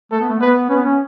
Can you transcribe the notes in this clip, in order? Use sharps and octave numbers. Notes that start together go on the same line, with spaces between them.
A3 A4
B3
A3
B3 B4
C#4 B4
B3
C#4